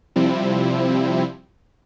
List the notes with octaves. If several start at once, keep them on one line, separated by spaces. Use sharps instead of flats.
C3 F3 G3 C4 E4